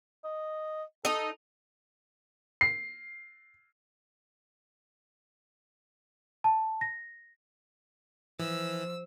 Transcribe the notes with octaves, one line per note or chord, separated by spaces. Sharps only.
D#5
D#4 A4 D#5
C7
A5
A#6
E3 F3 E6